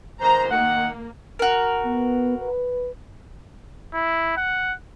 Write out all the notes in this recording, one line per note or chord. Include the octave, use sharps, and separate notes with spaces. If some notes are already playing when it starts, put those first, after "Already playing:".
G#2 D#3 C5 A#5
D#3 A#3 F#5
F#4 A#4
B3
B4
E4
F#5